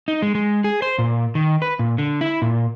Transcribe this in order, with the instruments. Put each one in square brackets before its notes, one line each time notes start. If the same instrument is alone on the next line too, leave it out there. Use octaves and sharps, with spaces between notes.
[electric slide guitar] D#4
G#3
G#3
G#4
C5
A#2
D#3
B4
A#2
D3
E4
A#2